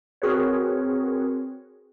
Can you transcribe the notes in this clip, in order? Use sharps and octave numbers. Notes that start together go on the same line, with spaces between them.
C4 F#4 G#4 A#4 B4 C#5